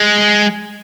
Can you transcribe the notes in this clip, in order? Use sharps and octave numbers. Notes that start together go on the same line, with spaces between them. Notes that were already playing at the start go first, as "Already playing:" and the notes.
Already playing: G#3